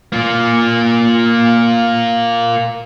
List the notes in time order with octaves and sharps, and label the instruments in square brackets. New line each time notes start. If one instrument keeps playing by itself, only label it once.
[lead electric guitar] A#3 F4